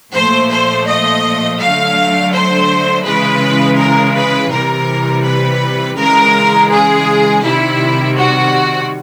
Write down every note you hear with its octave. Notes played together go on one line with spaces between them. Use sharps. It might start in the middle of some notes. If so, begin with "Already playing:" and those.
A#2 F3 A3 C5
C5
D#5
D3 F#3 A3 F5
C5
C#3 E3 G#3 B4
A#4
B4
C3 E3 G3 A#4
B4
C#3 E3 G#3 A#4
G#4
C3 D#3 G3 E4
F#4